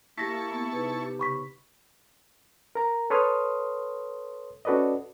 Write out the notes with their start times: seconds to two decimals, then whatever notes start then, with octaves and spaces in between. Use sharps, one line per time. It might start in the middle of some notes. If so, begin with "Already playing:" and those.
0.18 A#3 E4 G4 A5 C#6 A#6 B6
0.52 B3
0.72 C3 D#4 G#4 B4
0.98 G4
1.19 C#3 B5 C#6 B6
2.75 A#4 A#5
3.10 A4 B4 C#5 C6 D#6 F6
4.65 C#4 F#4 A4 B4 D5 D#5